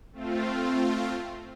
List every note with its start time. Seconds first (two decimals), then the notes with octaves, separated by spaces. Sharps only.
0.13 A3 C4 F4